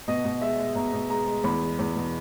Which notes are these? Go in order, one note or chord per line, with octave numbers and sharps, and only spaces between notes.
B2 D#5
B2
G#3 E5
G#3
B2 A#5
B2
G#3 A#5
G#3
E2 B5
G#3
E2
B2